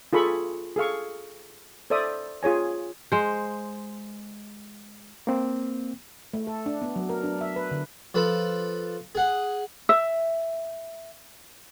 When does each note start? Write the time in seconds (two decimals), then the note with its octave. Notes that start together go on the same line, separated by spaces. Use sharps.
0.13 F4 G#4 A4 B5 C#6
0.76 G#4 A4 F5 C#6
1.90 A4 C5 D5 E5 D#6
2.43 F4 G#4 C#5 G#5
3.12 G#3 C5
5.27 A#3 C4
6.34 A3
6.47 A4
6.66 D4
6.82 B3
6.96 F#3
7.09 A#4
7.24 D4
7.41 E5
7.56 B4
7.71 D3
8.15 F3 A4 B4
9.15 G#4 F#5
9.89 E5 E6